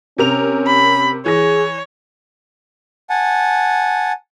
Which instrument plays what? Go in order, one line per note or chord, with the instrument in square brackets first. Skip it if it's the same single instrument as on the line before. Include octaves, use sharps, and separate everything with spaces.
[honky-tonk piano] C3 A#4 F7 [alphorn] C#4
[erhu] B5
[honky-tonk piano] E3 A#6 [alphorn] G#4 [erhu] C#5
[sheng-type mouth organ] F#5 G#5 A5